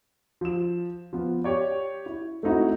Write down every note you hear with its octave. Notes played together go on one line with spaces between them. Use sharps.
F3 E7
F3 B3
G4 C#5 D5
E4
A3 C4 D#4 E4 F#4